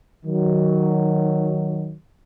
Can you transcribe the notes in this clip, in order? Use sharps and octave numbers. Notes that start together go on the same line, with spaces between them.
D#3 F#3